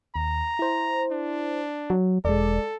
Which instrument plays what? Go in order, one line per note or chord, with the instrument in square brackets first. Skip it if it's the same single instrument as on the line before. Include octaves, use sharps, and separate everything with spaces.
[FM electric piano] D#2 [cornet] A#5
[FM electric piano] E4 C5
[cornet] D4
[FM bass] F#3
[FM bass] E1 [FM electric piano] G#3 D5 [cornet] A4